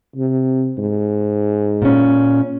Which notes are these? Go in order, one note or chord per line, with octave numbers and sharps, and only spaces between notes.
C3
G#2
A#2 C#4